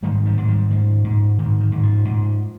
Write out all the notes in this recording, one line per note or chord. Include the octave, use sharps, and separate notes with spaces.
G#2 D#3 G3
D#3 G3
G#2
D#3 G3
G#2 F3
G#2
G#2 D#3
D#3
G#2
F3
G#2